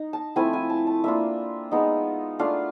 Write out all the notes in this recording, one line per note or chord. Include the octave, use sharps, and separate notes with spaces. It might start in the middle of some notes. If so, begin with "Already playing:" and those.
Already playing: D#4
A5
F3 A3 C4 E4 G#5
G#5
A5
A5
A#3 D4 F4 E5
G#3 B3 D#4
A3 D4 F4 F5